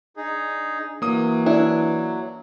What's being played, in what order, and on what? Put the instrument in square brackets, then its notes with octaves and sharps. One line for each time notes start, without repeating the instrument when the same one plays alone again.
[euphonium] D4 [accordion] D#4 G#4
[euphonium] E3 [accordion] F#3 [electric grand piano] A#3 D#6
[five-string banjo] D4 E4